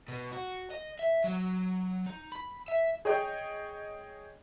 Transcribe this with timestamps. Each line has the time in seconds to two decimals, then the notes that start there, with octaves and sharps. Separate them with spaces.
0.08 B2
0.33 F#4
0.71 D#5
0.99 E5
1.24 F#3
2.06 D#4
2.32 B5
2.68 E5
3.05 G#4 C#5 D#5 G5